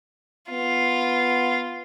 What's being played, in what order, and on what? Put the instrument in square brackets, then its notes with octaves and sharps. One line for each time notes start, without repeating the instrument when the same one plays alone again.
[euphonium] B3 [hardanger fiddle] F4